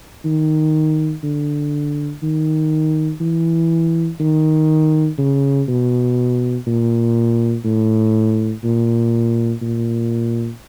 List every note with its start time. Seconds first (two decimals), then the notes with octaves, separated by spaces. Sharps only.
0.25 D#3
1.23 D3
2.23 D#3
3.21 E3
4.20 D#3
5.18 C#3
5.68 B2
6.67 A#2
7.64 A2
8.64 A#2
9.62 A#2